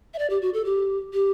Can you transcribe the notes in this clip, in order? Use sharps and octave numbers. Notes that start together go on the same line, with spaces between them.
E5
D5
G4
F#4
A4
G4
G4